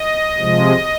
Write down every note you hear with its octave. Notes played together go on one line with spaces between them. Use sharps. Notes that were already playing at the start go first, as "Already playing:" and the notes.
Already playing: D#5
C3 F3 G#3